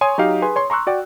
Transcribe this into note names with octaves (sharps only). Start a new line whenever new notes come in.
C#5 G#5 C6 C#6 D#6
F#3 D#4 G4 F5
G#4 B4 G#5 C6
C#5 C6
A#5 C6 C#6 E6 F#6
F#4 D5 G5